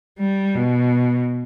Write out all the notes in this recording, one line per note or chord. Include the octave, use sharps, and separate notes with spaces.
G3
B2